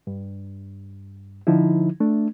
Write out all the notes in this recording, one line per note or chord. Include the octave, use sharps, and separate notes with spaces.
G2
D3 F3 D#4 E4
A3 D4